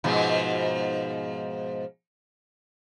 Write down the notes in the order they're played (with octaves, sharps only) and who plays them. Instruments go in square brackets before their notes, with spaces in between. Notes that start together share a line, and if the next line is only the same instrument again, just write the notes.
[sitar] G#2 B2 F3